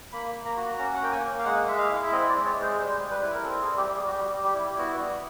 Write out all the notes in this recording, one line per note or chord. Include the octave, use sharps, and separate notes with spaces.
A#3 B5
A#3
A#5
F#4
C#4 A#5
F#5
A#3 G5
G#5
A#3
F5
G#3 F#5
G#3 E5
F5
E4
E5
C4 D#5
D5
G#3
C#5
G#3
C5
G3 C5
G3
B4
E4
A#4
C4 A4
G#4
G3
G4
G3 G#4
F#4
G3 G4
G3
G4
E4
B3 F#4
G3